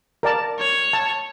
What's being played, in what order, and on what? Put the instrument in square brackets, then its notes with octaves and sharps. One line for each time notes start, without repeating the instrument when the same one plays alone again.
[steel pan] A#4 D5 A5
[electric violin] C#5
[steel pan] A5